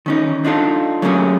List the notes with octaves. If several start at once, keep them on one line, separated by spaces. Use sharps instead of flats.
D#3 C#4 D#4
D4 D#4 F4 A4
F#3 A3 A#3 C#4 G4 G#4